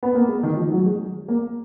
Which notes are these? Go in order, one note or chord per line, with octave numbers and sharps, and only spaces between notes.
B3
A#3
G#3
D#3
F3
F#3
G#3
A#3